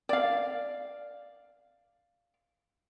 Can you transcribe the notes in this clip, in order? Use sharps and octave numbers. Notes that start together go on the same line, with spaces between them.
D5 F5